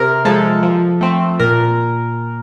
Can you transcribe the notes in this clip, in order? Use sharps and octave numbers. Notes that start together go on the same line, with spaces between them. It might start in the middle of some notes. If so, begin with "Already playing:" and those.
Already playing: C3 A#4
F3 G#3 A4
F3
A3 C4
A#2 A#4